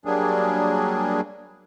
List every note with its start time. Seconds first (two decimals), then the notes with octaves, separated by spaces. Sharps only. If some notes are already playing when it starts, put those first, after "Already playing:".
0.05 F#3 G3 A#3 D4 G#4